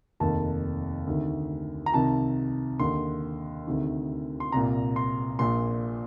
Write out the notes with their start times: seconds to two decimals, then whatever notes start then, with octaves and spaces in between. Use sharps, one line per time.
0.20 F1 D#2 D#3 A5
1.07 D2 C3 D#3
1.86 A#5
1.93 C2 C3 D#3 A5
2.79 D#2 D3 C6
3.67 D2 C3 D#3
4.40 C6
4.52 C2 A#2 A#5
4.96 C6
5.39 A#1 A#2 C6